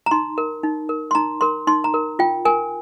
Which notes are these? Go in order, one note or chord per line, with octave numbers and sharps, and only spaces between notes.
A#5
D#4 C6
A#4
D#4
A#4
C6
D#4 A#5
A#4 C6
D#4 C6
A#5
A#4
F4 G5
A#4 G#5